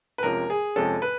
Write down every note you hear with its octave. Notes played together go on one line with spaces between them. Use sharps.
B4
F2 C3 F3 G#3 C#4 A#4
G#4
F2 C3 F3 G#3 C#4 A4
B4